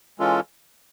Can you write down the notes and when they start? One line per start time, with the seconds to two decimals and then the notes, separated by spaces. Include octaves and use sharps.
0.19 E3 G#3 C#4 F4 A4